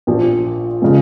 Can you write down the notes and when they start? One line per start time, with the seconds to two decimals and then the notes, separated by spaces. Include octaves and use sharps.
0.07 A#1 A#2 F3
0.82 C#3 F3 G#3